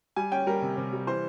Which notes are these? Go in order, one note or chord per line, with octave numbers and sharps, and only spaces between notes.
G3 G#5
C#4 G5
G3 A#4
C3
C3
G3
E3 C5